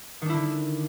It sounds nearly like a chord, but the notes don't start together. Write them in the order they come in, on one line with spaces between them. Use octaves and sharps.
D#3 D4 E4 D3